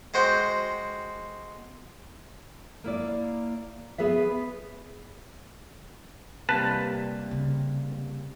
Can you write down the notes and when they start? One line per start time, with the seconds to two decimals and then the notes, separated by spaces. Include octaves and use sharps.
0.14 G#3 F#4 C5 G5
2.84 A#3 E4 D5
3.98 B3 G#4 B4 E5
6.49 C3 G3 A#3 B4 A5
7.31 C#3